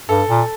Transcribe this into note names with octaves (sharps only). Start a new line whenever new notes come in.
G2 A4
A#2